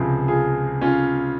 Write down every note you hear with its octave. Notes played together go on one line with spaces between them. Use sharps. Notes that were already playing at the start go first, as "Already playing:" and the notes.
Already playing: C#2 C3 F3 G#4 C5
F4 G#4
C#4 F4